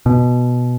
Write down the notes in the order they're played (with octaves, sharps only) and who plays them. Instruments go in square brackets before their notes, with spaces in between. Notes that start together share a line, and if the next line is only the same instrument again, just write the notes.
[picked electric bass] B2